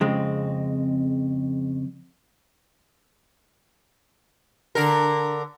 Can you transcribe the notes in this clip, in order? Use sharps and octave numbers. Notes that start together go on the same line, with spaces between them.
F2 C#3 G#3 C4
D3 A#4